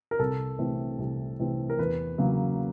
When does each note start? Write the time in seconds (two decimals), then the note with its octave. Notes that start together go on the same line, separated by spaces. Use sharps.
0.11 A#4
0.19 C2 A4
0.59 C3 E3 A3 C4
0.99 C2
1.39 C3 E3 A3 C4
1.70 A#4
1.79 E2 B4
2.18 C#3 F#3 A#3